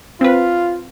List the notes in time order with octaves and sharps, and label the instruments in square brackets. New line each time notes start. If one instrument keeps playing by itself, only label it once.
[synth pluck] C4 B4 [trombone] F4